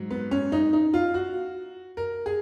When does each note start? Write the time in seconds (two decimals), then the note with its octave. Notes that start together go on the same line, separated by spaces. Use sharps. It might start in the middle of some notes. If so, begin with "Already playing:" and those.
Already playing: G#2 F#3
0.11 B3
0.31 C#4
0.52 D#4
0.73 D#4
0.94 F4
1.14 F#4
1.97 A#4
2.26 G#4